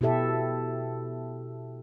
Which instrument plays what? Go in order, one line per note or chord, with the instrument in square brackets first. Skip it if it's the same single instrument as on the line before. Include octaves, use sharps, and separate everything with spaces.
[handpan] B2 E4 G4 A4 E5